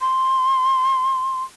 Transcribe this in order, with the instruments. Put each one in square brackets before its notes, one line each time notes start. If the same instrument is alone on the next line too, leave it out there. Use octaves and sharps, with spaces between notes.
[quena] C6